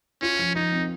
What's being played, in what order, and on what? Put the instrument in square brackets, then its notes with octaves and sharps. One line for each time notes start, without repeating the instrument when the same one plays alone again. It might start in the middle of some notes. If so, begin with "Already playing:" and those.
[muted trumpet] C#4 [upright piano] F4
[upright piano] F3
[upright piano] F3 [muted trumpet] D#4
[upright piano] C4